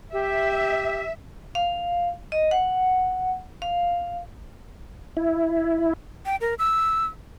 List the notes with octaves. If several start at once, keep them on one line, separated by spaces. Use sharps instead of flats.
G4 E5
F5
D#5
F#5
F5
E4
G5
A#4
E6